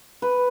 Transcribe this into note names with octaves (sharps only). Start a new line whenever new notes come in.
B4